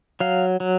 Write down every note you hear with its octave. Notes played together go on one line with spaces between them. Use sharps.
F#3 F5
F#3